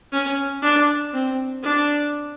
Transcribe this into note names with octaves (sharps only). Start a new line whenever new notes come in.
C#4
D4
C4
D4